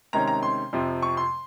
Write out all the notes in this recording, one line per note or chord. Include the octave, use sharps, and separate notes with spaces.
C3 D#3 G#3 C#4 A#5
A#5
C6
F2 C3 F3
C#6
C6